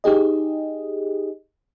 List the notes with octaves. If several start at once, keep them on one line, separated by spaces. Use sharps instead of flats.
D#4 G4 G#4 D#5